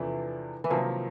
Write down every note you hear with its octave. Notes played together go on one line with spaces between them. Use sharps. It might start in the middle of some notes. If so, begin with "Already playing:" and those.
Already playing: E2 C3 E3 F3 A3 D4
E3
C3 D#3 F3 F#3 A#3